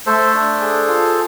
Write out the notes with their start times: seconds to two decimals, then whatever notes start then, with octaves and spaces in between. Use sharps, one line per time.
0.06 A3 A4 C5
0.33 D4
0.60 G#4
0.88 F4